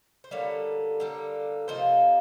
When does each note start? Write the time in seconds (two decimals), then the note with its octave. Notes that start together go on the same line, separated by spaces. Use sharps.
0.24 C5
0.31 D3 G3 A#3 C#5
1.00 D3 G3 A#3
1.68 C3 F3 A#3 D#4 C5